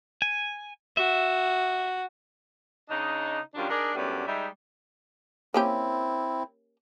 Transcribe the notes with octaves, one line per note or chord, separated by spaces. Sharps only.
G#5
F#4 E5
C#3 D4 D#4 D#5
F#2 D#3 G3 D4 F4
D4 D#4 G#4 A#4 D5
F#2 A2 G3 B3 D4
G3 G#3 D#4 E5
A#3 C4 C#4 E4 G4